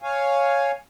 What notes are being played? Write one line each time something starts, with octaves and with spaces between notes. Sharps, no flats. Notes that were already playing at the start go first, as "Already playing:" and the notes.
C#5 F5 G#5